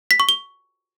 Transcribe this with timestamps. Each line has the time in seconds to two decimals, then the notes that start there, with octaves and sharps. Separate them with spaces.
0.11 B6
0.20 C#6
0.29 G7